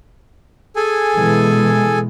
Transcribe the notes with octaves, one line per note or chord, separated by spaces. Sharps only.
G#4 A4 G#5
B2 E3 G#3